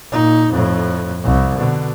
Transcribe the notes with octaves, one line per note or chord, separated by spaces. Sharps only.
A#2 D#4
F2 A2
C2
B2 D3